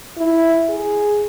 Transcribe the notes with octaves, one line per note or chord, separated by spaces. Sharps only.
E4
G#4